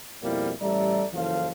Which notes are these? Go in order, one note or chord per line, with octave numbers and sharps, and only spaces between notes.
F2 B2 G3 A#3 E4
A1 G3 A4 D5 E5 A#5
F#1 E3 F3 F4 A4 F5